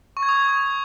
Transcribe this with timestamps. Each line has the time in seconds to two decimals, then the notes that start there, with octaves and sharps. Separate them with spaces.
0.17 C#6
0.23 G#6
0.29 D#6